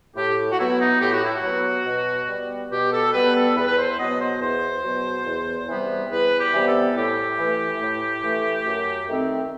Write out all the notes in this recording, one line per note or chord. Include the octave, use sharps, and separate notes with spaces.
A2 G4
F#4
F#3 B3 E4
D#4
A2 G4
F#4
E4
F#4
F#3 B3
B2
G3 B3
B2 G4
A4
G3 B3 B4
A4
E2 B4
B4
C5
B2 F#3 B3 D#5
C5
E2 C5
B2 F#3 B3
E2
C3 E3 G3 B3
E2 B4
G4
C3 E3 G3 B3
A4
A2 G4
E3 A3
A2
E3 A3
F#2
D#3 A3 C4